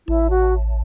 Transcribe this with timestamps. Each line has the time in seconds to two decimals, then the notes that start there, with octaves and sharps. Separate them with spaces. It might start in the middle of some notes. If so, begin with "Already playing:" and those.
0.07 A1 E4
0.30 F#4